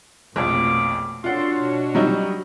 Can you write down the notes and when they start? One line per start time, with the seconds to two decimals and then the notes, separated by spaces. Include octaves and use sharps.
0.36 A#1 F2 B2 A3 C#5 F5 D6
1.24 D4 F4 F#4 A4 C#5 D5 F#5 C6
1.57 B2
1.95 F#3 G3 D#4